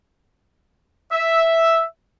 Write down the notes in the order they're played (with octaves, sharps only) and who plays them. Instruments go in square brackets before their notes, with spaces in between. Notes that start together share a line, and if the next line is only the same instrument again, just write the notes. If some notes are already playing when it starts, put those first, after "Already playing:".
[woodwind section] E5